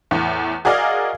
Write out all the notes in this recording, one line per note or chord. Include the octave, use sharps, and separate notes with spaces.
E2 A2
F#4 G#4 A#4 D5 D#5 F5